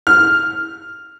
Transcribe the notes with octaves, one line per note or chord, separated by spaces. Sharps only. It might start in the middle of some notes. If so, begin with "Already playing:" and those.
F6